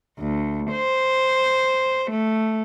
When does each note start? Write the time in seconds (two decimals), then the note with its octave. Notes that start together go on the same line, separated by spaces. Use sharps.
0.18 D2
0.71 C5
2.10 A3